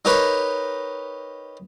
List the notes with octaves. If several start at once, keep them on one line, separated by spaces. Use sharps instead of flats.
D#4 G4 A#4 B4 C#5